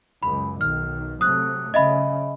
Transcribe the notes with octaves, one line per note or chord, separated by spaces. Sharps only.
C#2 F#2 B5
B1 D#3 F6
C3 F#3 A3 D#6 F#6
C#3 D#5 E5 B5